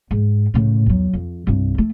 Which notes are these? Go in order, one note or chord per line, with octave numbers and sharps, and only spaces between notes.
G#2
A2 C#3
E2 F#3
F2
C2 G2
A3